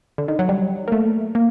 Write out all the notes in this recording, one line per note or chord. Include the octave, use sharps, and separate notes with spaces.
D3
D#3
F#3
G3
A#3
A3
A#3